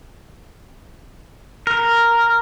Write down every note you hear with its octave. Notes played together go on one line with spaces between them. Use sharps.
A#4